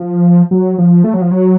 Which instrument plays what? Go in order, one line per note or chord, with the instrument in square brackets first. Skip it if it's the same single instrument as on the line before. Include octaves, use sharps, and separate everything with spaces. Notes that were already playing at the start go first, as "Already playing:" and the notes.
Already playing: [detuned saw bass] F3
F#3
F3
A3
F#3
F3
F#3